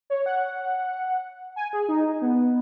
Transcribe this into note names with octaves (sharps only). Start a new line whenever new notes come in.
C#5
F#5
G#5
G#4
D#4
B3